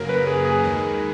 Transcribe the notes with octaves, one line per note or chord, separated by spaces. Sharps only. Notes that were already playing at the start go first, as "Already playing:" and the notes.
Already playing: F#2 C#3 F#3 A#3 A#4
B4
G#4
G#4
D#2 D#3 G#3